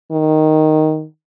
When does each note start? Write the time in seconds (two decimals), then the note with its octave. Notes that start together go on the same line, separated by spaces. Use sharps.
0.11 D#3